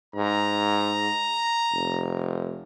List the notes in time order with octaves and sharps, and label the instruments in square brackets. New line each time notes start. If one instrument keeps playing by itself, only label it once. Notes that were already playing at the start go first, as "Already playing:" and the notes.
[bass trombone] G#2 [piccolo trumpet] A#5
[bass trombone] F1